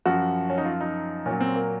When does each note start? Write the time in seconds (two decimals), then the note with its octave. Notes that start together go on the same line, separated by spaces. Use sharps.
0.06 F#2 F3 F#4
0.50 C#4
0.58 D#4
0.65 F4
0.81 D#4
1.26 A#2 F#3 C#4
1.41 C4
1.56 A#3